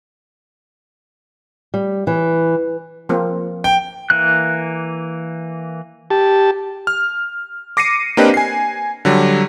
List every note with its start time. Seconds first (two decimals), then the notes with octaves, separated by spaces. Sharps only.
1.74 G3
2.07 E3
3.09 F3 A#3 C4
3.64 G5
4.10 E3 A#3 F#6
6.11 G4 A5
6.87 F6
7.77 D6 A#6 C7 C#7 D#7
8.17 A#3 C4 D4 G4 B4 D#5
8.34 G#5 C7
9.05 D3 F#3 G3